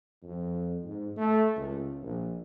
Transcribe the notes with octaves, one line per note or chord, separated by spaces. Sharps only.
F2
G#2
A3
C#2
A#1